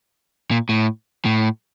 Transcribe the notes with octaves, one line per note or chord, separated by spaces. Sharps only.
A#2
A2
A2